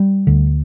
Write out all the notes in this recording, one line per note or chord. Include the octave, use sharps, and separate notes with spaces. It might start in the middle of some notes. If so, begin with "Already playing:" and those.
Already playing: G3
D2 D3